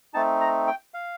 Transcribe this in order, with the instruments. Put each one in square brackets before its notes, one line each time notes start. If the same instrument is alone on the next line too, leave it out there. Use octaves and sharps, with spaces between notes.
[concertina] A3 C4 D#4 A5
A#5
G5
F5